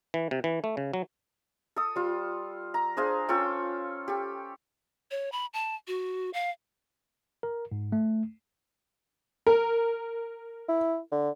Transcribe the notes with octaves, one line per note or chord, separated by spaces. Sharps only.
E3
C3
E3
A3
C#3
F#3
A4 D#6
G3 F4
A#5
D4 G#4 C5 F5
C#4 F4 A4 G5
G4 A4
C#5
B5
A5
F#4
F5
A#4
G#2
A3
A#4
E4
D3